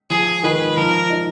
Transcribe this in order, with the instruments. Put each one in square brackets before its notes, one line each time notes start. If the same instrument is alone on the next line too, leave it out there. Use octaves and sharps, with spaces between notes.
[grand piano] F3 [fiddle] G#4
[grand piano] D#3 [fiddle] B4
[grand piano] F3 [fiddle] A#4
[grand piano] D#4